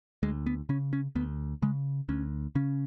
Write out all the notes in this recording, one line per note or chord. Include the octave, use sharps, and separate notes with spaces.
D2 G#3
B3
C#3 C#4
C#4
D2 B3
C#3 G#3
D2 C#4
C#3 C#4